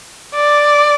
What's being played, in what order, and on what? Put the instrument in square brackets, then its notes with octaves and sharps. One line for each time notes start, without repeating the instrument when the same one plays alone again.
[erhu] D5